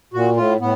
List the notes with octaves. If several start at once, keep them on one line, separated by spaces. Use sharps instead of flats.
A#2 F#4
A2 F4
A2 B3